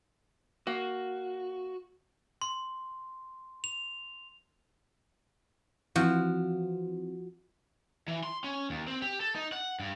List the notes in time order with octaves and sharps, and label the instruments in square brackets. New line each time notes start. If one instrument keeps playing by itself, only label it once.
[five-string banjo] A#3 [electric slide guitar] F#4
[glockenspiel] C6
F7
[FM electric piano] E3 C4 [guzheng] F3 F#4
[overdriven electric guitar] E3
C6
C#4
D#2
C4
G4
A4
D#4
F#5
G2